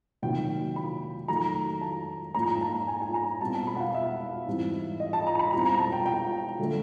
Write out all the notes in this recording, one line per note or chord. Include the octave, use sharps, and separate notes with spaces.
C3 D#3 F#3 A#3 G5
B5
D#3 F#3 A3 A#5
A5
G#2 F3 A#3 C#4 A#5
A#5
A5
A5
G#5
G#5
A#5
B2 G3 C4 A5
A5
B5
F#5
F5
E5
G#2 E3 G3 C4 E4
D#5
A5
A#5
B5
B2 G3 C4 E4 A#5
A#5
A5
G5
G5
D3 F#3 A3